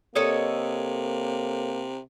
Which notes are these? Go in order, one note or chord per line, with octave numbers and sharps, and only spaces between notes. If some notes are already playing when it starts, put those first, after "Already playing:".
C3 A#3 A4 C#5 D#5